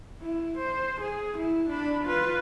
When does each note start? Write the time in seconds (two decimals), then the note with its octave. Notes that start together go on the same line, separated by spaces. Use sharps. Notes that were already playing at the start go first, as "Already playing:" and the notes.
0.21 E4
0.58 C5
1.01 G#4
1.38 E4
1.70 D4 B5
2.04 F4 B4